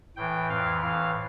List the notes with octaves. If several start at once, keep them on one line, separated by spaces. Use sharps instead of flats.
A2 E3 G5
F2 E3 F5
A2 E3 F5